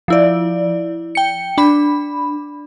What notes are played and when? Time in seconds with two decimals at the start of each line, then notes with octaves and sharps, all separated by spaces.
0.08 F3 E4 D5
1.15 G5 C#7
1.58 D4 B5